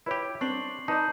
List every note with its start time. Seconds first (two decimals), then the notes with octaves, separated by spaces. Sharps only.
0.06 E4 G4 B4 C#5
0.41 C4 D4 C#6 C7 F#7
0.88 D#4 B4 D5 D#5 A5 A#5 G6